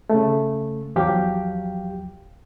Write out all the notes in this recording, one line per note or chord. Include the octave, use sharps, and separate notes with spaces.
C#3 A3
E2 F3 F#3 G4 F5 G5